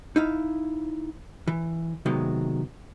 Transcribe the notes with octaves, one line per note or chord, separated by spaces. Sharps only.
D#4 E4 F5
E3
C3 D#3 F#3 G#3 B3